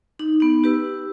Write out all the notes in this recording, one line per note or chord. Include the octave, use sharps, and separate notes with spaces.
D#4
B3 D#4
G4 B4 E6